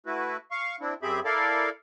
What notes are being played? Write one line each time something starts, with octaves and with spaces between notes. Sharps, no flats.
A3 E4 F#4 B4
F5 C#6
C4 D4 E4
F#2 C4 G4 G#4 E5 B5
E4 A4 A#4 D5 F5